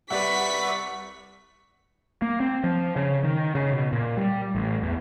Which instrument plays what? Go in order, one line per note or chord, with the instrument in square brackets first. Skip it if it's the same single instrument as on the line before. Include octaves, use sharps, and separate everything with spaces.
[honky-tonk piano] C2 G3 F#5 [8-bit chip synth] B4 D5 E5 [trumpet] C#6 [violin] B6
[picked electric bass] A#3
C4
F3
C#3
D#3
C#3
B2
A#2
G3
A1
E2